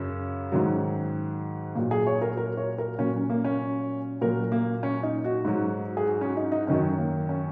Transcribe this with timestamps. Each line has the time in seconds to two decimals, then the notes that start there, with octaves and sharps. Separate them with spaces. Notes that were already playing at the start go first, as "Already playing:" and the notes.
Already playing: F#2 C#3 F#3 C#4
0.52 G#2 D#3 F#3
1.75 A#2 F#3
1.91 G#4
2.07 C#5
2.22 A#4
2.37 A#4
2.57 C#5
2.78 A#4
2.99 A#2 F#3 C#4
3.14 C#4
3.30 A#3
3.44 C#4
4.21 A#2 F#3 A#4
4.52 A#3
4.83 C#4
5.03 D#4
5.24 F#4
5.45 G#2 F#3
5.97 G#4
6.06 F#4
6.21 C#4
6.37 D#4
6.52 D#4
6.67 F#2 D#3 F#3 C#4
6.98 A#3
7.29 C#4